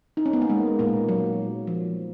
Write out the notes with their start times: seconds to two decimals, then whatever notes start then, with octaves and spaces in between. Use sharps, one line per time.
0.17 D#4
0.26 C#4
0.33 B3
0.42 A#3
0.50 G#3
0.79 A#2 A#3
1.09 F#3
1.67 F3